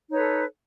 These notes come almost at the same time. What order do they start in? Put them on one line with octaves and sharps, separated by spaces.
D#4 C#5 B4 A4